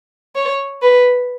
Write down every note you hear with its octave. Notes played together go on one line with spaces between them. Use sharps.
C#5
B4